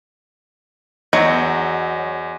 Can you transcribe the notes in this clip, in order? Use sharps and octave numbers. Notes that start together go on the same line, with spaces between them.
E2 F#3 D#5